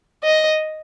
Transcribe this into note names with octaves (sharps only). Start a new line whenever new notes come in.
D#5